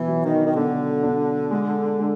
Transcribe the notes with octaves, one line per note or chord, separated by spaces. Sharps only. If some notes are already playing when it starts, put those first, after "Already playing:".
Already playing: B2 E3
F#3
D#3
D#3
B2 D3
D4
G#3
G#3